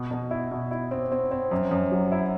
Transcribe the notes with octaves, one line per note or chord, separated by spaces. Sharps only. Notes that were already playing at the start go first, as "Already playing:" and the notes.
Already playing: B2
B2
E4
B2
E4
C4
C4
C4
F#2
F#2
F#3
E4